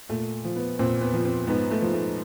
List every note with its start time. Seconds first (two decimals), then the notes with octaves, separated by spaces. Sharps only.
0.09 A#2 A3
0.45 F3
0.56 B3
0.79 A#2 C4
1.01 B3
1.14 F3
1.25 C4
1.47 G#2 B3
1.71 A3
1.82 F3
1.93 A3